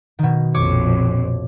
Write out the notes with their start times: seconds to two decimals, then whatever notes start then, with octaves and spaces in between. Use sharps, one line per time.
0.19 B2 D#3
0.54 A#1 F2 C#5 D6